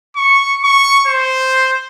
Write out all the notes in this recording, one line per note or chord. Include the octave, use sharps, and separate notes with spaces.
C#6
C#6
C5